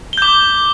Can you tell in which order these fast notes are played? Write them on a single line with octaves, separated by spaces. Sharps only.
G7 G6 D6